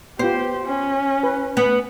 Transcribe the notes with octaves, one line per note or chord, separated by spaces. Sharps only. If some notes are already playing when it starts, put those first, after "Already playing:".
B3 F4 G4 C5
C#4
B4
B3